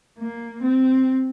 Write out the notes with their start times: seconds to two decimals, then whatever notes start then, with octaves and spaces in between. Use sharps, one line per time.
0.19 A#3
0.62 C4